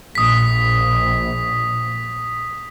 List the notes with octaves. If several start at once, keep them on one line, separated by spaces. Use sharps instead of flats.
A#1 D#6 B6